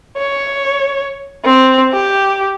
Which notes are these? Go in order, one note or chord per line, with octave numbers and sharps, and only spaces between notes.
C#5
C4
G4